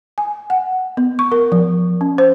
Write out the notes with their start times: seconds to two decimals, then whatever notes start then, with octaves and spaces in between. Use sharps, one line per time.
0.18 G#5
0.50 F#5
0.97 B3
1.19 C#6
1.32 A#4
1.52 F3
2.01 C#4
2.18 C5